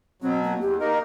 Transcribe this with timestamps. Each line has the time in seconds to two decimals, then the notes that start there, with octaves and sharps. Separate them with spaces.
0.22 B2 F#3 C4
0.43 A#3
0.61 E2 G4
0.80 A#3 D#4 A#4 D#5